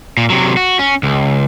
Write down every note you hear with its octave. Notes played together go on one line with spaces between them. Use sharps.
A#2
C3 F#3
F#4
C#4
C#2